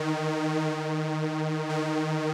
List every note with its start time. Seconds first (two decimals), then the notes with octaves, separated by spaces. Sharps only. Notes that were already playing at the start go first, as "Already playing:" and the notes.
Already playing: D#3
0.69 D#3
1.70 D#3